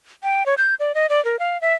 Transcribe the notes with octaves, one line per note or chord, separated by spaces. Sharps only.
G5
C#5
G6
D5
D#5
D5
A#4
F5
E5